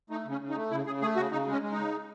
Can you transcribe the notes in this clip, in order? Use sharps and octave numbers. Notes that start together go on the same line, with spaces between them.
A3 D#4
C#3
C#4
C#3
D#4
A3
C#3 E4
C#3 G#4
A3 G#4
C#3 F#4
C#3 D#4
G#3
C#4
G#3
D#4
C#3